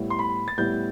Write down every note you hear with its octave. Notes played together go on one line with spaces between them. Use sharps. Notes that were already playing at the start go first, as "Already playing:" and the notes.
Already playing: A2 G3 B3 E4
C6
B5
A6
A2 G3 B3 E4 G6